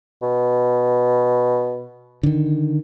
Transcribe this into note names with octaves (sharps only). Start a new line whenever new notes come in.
B2
D3 D#3